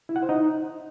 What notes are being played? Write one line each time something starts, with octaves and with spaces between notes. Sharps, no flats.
E4
F#5
C5
D#4